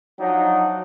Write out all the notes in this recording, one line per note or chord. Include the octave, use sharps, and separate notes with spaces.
F3 F#3 D4 D#4 F#5